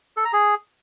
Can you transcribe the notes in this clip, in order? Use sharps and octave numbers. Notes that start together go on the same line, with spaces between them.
A4
A#5
G#4